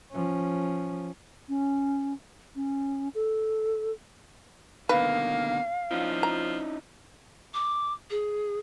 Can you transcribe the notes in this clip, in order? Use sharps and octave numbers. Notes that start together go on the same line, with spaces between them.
F3 C#4
C#4
C#4
A4
B2 D3 D#3 A#3 B4 F5
F3 C#4 D#4 E4
A#5
D6
G#4